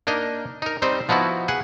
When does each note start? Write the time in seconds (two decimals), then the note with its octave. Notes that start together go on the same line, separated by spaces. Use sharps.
0.07 A#3 D4 D#4 A#4 D#5
0.62 D#4 A#4
0.82 G3 C4 D#4 C5
1.09 F3 B3 D#4 E4 F#4
1.48 G#4 B4 F#5